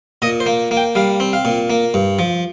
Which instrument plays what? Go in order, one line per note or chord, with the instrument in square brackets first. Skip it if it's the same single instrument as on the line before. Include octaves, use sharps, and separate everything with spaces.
[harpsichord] A#2 D#5
C5
A#3
A#3
G5
G3 F5
C4
F5
A#2
A#3
G2
F3